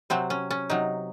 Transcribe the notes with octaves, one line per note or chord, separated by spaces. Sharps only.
C3 F#3 C4
C#4
C#4
C3 F#3 D#4